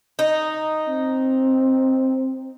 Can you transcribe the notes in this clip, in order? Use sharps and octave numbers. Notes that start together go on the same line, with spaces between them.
D#4
C4